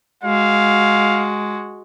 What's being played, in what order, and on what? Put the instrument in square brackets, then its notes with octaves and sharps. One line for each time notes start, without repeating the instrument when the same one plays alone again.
[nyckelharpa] G#3 F#4 [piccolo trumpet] F5